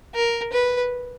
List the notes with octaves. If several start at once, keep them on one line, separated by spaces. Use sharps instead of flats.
A#4
B4